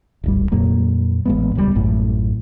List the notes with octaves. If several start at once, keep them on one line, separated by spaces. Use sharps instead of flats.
D1 G#1 G3
F2 A#2 F#3 A#3
A1 G#3 B3
D#1 C#2 B2 G3
A1 F#2 A2